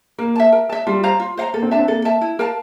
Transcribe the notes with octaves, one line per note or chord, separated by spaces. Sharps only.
A#3 A#4
E5 A5
A#4
E5 A5
G3 F4
C5 F5 A#5
F4
C5 F5 A#5
A#3 A4
C4
D4 E5 A5
C4
A#3 A4
E5 A5
E4
A#4 F5 A5